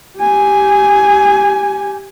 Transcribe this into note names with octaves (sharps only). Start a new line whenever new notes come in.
G4 G#5